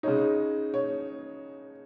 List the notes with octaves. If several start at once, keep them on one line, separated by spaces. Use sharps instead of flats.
C#3 G#3 D#4 C#5
C#5